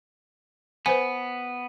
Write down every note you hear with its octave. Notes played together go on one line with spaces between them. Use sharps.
B3 B4 C5 G#5